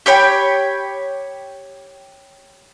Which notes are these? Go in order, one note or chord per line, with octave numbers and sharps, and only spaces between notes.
G4 C#5 G5 B5